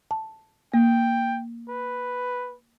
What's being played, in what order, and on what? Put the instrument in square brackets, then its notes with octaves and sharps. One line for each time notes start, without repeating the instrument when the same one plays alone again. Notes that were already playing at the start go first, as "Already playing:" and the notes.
[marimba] A5
[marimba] A#3 [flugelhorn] G5
[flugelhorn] B4